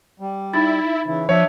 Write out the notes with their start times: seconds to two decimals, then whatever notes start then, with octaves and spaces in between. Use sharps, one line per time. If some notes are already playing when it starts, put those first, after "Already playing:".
0.20 G3
0.53 D#4 E4 B5 A6
1.06 C#3 E3 E4
1.29 F3 D4 C#5 E5